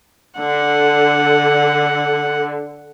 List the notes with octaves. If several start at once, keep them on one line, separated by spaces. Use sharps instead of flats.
D3 F#5